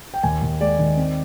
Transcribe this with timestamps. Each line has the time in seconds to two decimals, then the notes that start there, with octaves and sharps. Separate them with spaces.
0.14 G5
0.23 D#2 G#5
0.42 D#2
0.60 G#3 D5
0.79 D#3
0.97 C4